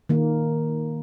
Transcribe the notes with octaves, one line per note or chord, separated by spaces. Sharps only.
D#3 A#3